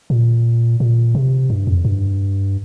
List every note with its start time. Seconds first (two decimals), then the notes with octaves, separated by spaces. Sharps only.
0.10 A#2
0.80 A#2
1.15 C3
1.50 G2
1.67 F2
1.85 G2